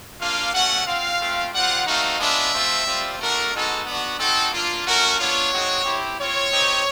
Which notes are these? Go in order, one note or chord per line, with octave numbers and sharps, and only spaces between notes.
A#3 D4 F4 F5
A3 C#4 F#4 F#5
C4 F4 F5
A3 C4 F4
G3 C4 F4 F#5
A3 C4 D#4 F#4 F5
G#3 B3 D4 F4 E5
A3 C4 F4
G3 C4 F4
A3 D4 F#4 A#4
G#3 B3 D#4 F#4 A4
B3 D4 F#4
C4 D#4 F#4 A4
A#3 D4 F4
A3 C#4 F#4 A#4
B3 D4 F4 C#5
G#3 C4 D#4 F#4
C4 E4 G4
C4 F4 C#5
C4 D#4 G4